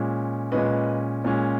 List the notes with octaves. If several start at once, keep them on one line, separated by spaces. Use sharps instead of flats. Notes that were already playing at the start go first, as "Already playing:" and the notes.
Already playing: A#2 G#3 C#4
A#2 G#3 C#4 B4 D#5
A#2 G#3 C#4